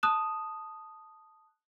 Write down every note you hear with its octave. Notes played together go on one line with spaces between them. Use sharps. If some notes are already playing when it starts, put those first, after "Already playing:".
A5 D#6 F#6 E7